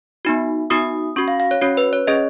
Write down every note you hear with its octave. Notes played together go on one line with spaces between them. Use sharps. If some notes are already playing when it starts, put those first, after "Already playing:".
B3 D#4 F#4
B3 D#4 F#4 D#6
C#4 F#4 C#6
F5
F5
C#5
C#4 F#4 C#5
B4
C#5
C#4 G#4 D#5